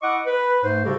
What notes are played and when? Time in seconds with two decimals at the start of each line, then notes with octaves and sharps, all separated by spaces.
0.02 E4 D#5 F#5 C#6 D6
0.26 B4
0.63 G#2 A3 C5
0.84 C#3 G3 E4 F#4 G4 A4